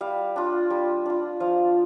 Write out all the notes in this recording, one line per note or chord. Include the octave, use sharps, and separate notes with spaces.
G3 F5
D4 F4
G3
D4 F4
F3 F5